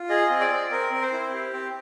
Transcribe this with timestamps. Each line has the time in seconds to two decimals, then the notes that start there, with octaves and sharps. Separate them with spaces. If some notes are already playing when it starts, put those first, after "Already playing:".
Already playing: F4
0.09 G#4 D#5
0.30 C4
0.40 D5
0.51 C4
0.71 C4 A#4
0.91 C4
1.02 C5
1.12 E4
1.33 G4
1.53 C4